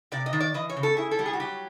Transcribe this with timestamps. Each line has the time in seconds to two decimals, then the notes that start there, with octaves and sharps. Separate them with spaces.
0.12 C3 D5
0.26 D#5
0.33 D#3
0.40 D5
0.54 E3 D#5
0.69 C#5
0.77 C#3
0.83 A4
0.97 E4 G#4
1.11 A4
1.19 G3
1.26 G#4
1.33 F#4
1.40 F#3 G4